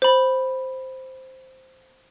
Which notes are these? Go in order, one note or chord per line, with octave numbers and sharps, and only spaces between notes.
C5 B5